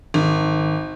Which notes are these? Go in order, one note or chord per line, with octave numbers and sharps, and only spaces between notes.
G#1